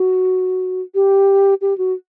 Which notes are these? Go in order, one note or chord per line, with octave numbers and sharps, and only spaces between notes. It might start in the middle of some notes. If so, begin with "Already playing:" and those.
Already playing: F#4
G4
G4
F#4